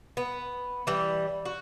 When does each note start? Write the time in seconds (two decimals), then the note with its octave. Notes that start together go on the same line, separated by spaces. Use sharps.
0.17 B3
0.87 E3 G3
1.45 F#4